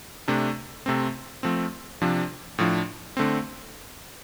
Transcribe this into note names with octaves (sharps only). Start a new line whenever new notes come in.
C3 A3 D4
C3 A3 C4
F3 A3 C4
C3 F3 D4
A2 F3 D4
D3 A3 C4